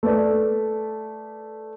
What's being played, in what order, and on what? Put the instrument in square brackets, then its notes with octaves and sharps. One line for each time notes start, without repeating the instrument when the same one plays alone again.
[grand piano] A3 B4 D5